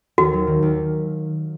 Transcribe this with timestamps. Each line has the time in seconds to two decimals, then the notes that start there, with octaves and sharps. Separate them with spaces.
0.18 D#2 F#4
0.33 F#3
0.47 D#3
0.62 D#2